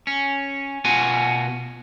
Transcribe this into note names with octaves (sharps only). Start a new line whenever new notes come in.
C#4
B2 F4 F#4 G#5